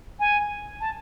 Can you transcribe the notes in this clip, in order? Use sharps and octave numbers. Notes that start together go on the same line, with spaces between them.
G#5
A5